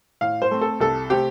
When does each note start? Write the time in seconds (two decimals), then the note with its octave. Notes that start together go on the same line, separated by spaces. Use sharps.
0.21 A2 F5
0.42 C5
0.51 A3 C4
0.61 A4
0.80 C2 A4
1.10 C3 A3 C4 G4